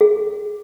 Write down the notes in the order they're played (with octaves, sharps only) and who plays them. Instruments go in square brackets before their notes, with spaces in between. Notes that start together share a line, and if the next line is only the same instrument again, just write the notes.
[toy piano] G#4